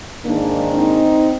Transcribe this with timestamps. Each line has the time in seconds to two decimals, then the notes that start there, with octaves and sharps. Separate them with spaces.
0.25 G#2 D#3 A#3 D4
0.75 C4 D#4